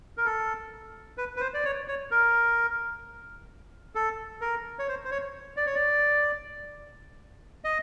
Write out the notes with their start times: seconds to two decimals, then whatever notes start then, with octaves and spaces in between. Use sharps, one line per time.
0.17 A#4
0.26 A4
1.18 B4
1.36 B4
1.41 C5
1.54 D5
1.65 C#5
1.88 C#5
2.11 A#4
3.95 A4
4.41 A#4
4.79 C#5
4.88 C5
5.05 C5
5.11 C#5
5.57 D5
5.66 C#5
5.74 D5
7.64 D#5